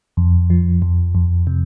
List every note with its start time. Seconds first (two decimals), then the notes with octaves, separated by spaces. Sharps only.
0.17 F2
0.50 F3
0.82 F2
1.15 F2
1.47 C3